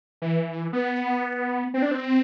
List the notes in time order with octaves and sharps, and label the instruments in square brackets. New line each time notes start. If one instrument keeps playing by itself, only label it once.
[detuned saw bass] E3
B3
C4
D4
C4